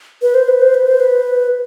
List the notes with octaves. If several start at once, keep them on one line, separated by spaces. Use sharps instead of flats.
B4
C5
B4
C5
B4
C5
B4